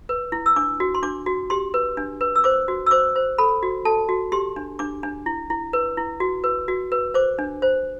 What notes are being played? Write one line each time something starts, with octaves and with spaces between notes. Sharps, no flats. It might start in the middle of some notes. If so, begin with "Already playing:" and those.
B4
E4
E6
D4 D6
F#4
C6
D4 D6
F#4
G4 C6
B4
D4
B4
E6
C5 D6
F#4
E6
C5 D6
C5
A4 B5
F#4
A4 A5
F#4
G4 C6
D4
D4 D6
D4
E4
E4
B4
E4
F#4
B4
F#4
B4
C5 D6
D4
C5